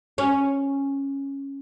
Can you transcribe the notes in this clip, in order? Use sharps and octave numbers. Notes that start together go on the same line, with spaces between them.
C#4